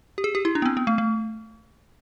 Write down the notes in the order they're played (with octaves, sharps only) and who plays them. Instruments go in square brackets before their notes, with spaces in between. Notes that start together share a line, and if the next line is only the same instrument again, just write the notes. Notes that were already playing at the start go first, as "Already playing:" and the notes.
[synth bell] G4
G#4
G4
E4
D4
B3
C4
B3
A3
A3